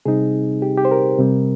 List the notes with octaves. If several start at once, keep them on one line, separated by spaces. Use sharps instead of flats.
C3 G3 C4 D#4 G#4
G4
G4
C5
A#4
C3 G3 C4